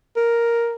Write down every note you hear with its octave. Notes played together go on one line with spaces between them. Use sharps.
A#4